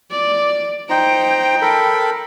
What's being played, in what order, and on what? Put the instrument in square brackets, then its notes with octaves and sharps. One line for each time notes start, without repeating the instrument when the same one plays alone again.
[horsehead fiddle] D5
[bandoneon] D#4 C5 A#5 [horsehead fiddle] G5
[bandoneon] A4 A#4 B5